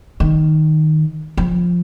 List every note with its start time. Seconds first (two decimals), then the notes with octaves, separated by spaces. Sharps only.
0.20 D#3
1.37 F3